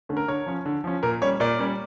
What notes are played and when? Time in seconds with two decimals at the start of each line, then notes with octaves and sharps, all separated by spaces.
0.09 D3 A3 C#4
0.17 A#4
0.28 D3 C#5
0.46 F3 C#4
0.66 D3
0.84 F3 C#4
1.03 A#2 A#4
1.22 G3 C#4 C#5
1.40 A#2 A#4 D5
1.59 G3 C#4